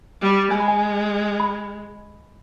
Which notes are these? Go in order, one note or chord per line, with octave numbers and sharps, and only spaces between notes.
G3
G#3 G#5
B5
G#5
B5